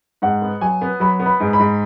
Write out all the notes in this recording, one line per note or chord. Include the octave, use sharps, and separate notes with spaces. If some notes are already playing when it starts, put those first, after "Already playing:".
G#2 F#5
B3
F#3 G#5
B3
F#3 B5
B3
B5
G#2
B5
G#2